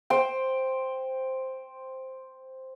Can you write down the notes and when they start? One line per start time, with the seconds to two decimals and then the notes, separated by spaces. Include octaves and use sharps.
0.10 C5 G5